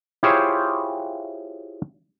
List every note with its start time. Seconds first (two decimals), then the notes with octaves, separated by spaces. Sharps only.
0.23 E4 F4 G4 G#4 C5 C#5